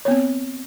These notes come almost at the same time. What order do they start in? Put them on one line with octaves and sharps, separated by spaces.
C#5 B3 C4